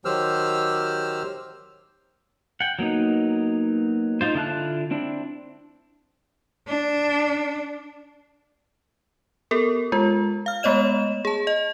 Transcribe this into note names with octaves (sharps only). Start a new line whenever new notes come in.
D#3 F#3 G4 C5 E6 F6
F#5 G5
F#3 A#3 B3 D#4
D#4 F4 C5
D3 E4 F4 A5 F#6
C4 D4 E4
D4
B3 G4 A4 A#4
G#3 F4
F5 F6
G#3 A3 B3 C#5 D#5 E7
G#4 A5
D#5